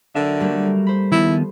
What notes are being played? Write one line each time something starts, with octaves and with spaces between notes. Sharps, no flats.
D3 F#3 A#4 E5
G3 A3 A#3
C5 B5
D#3 F3 B3 E4